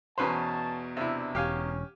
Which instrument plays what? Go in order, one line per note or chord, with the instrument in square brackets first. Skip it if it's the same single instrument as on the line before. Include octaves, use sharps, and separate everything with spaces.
[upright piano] E2 B2 A#5 [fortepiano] C#4 B4 C5 [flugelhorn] A5
[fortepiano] C3 E4 [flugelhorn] D4
[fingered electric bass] E1 [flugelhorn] C#4 [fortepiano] G4 F5 G#5